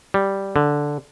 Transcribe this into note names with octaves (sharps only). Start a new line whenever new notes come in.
G3
D3